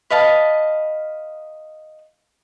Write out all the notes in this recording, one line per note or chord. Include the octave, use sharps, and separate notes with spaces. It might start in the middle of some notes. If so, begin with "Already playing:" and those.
B4 D#5 F5 A5